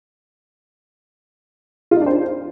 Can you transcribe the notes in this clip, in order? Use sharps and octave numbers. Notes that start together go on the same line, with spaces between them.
F4
D#4
D4
C5